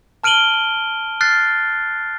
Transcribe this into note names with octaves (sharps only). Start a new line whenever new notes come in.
A5 F6 D7 D#7 F#7 G7
F6 F#6 A6 C7